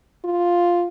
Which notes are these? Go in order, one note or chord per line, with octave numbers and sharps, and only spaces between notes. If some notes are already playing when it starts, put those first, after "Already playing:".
F4